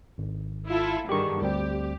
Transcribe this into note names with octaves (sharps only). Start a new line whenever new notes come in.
G#1
E4 F4 A4
G2 D3 D#3 G4 G#4 C#6
D2 G3 C4 G4